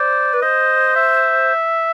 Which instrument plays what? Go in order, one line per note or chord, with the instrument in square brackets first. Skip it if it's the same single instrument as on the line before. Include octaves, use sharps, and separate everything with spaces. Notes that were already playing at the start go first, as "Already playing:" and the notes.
Already playing: [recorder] C5 [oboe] D5
[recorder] B4
[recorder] C5 [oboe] D#5
[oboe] E5